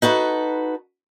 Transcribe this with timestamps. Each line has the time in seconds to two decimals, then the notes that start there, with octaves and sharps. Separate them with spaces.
0.02 D#4 F#4 A4 B4